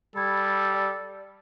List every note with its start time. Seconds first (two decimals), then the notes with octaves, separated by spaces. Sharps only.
0.16 G3 A4 B5 G#6
0.74 D5